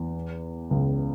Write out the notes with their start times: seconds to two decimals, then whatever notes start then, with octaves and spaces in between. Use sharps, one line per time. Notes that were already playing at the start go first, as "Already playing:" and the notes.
Already playing: E2 E3
0.71 C#2 C#3